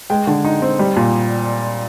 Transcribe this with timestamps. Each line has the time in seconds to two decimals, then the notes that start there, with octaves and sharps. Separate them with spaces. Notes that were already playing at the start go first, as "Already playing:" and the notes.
0.10 G#3 G5
0.27 D3
0.45 D#4
0.62 C4
0.79 G3
0.97 A#2